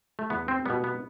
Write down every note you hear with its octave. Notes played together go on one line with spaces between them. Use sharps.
A3
E2 B3
C4
B2 G3 B3
B3